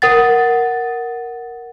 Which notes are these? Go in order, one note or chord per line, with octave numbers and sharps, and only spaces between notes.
A#4 F#5 A6